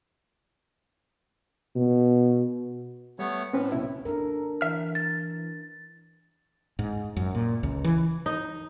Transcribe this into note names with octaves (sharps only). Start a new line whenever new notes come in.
B2
G3 A3 B3 C#5
A2 C4 C#4 B4
C2 B2 E4
D4 A4 A#4
E3 E5 F6
A6
G#2
F#2
A#2
C#2
E3
D#4